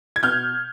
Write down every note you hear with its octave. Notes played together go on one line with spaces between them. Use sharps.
G#6
B2 F6 G6